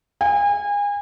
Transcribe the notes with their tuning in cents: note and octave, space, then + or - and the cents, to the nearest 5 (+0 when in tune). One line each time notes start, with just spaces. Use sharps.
G#5 -30